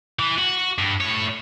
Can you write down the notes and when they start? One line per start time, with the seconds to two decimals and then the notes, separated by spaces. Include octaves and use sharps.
0.19 E3
0.39 F#4
0.78 G2
1.00 A2 C#5